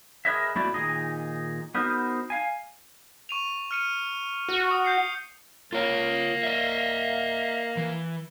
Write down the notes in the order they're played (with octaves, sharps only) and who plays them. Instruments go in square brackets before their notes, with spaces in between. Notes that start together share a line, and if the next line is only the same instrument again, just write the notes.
[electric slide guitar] G#4 A#4 B4 C#5 D#5 E5
E2 A3 E4 F#4 C#5 D5
A#2 D#3 D#4 G#4 D#5
B3 D#4 F#4 A#4 C5
F5 G#5
[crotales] C#6 D#7 F7
F6 C#7 D#7
[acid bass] F#4
[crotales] D#6
G6 C7 C#7
[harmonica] A#3 [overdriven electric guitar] F4 C#5
[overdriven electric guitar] D#5 E5
E3